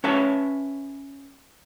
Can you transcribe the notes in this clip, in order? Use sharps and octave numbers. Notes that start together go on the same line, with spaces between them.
C#4 B4 C#5 E5 F5 A5